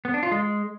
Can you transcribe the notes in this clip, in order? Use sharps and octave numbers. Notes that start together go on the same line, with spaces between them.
B3
D4
F4
G#3